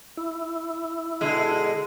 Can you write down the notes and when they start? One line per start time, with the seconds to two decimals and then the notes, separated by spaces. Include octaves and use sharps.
0.17 E4
1.21 B2 D3 G#3